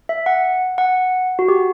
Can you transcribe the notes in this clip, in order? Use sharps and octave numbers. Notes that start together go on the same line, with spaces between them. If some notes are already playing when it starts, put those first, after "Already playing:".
E5
F#5
F#5
F#4
G4